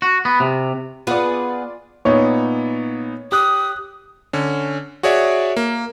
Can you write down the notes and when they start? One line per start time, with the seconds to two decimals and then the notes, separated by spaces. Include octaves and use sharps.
0.02 F#4
0.25 B3
0.40 C3
1.07 B3 F4 G#4 B4 D5
2.05 A#2 B3 D#4 C#5
3.32 G4 D#6 F#6
4.33 D3 C#4
5.03 F#4 G#4 C#5 D5 E5
5.57 A#3